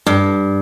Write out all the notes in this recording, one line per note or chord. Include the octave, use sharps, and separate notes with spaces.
G2